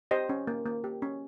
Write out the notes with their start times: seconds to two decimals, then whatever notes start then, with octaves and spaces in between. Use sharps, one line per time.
0.11 G4 C5 D#5
0.29 C#4
0.47 A#3
0.66 A#3
0.84 G4
1.02 C#4